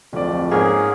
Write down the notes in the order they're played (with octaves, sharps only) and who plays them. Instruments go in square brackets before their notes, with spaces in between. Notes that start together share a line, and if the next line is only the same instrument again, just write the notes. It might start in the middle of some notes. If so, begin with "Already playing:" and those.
[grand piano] D1 D5 [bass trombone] F2
[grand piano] G#2 [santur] A#3 C#4 [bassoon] G#4